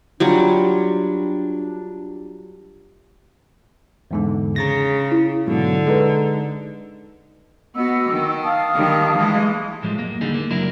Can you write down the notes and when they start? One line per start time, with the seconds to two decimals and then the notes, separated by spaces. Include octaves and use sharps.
0.20 F#3 G3 D4 F4
4.11 E2 G#2 D3
4.56 C#3 A#5 A6 A#6
5.12 E4
5.48 G#2 B2 D3 F#3
5.87 G#3 D#4 A4 B4
7.75 B3 F#4 D#5 E6
8.10 D#3
8.43 F5 A5 D#6
8.75 D#3 G3
9.16 E3 G#3
9.83 A2 F3 G3 G#3
9.98 F#2 A#3
10.21 D#2 D3 G3 D#4 G#4
10.34 A#3
10.50 C#2 F#2 F#3 D4 E4 A#4